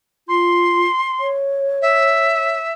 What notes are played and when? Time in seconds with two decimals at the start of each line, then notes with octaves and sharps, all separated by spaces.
0.28 F4 C6
1.20 C#5
1.82 E5